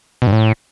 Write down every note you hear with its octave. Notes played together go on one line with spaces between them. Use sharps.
B2
G2
A2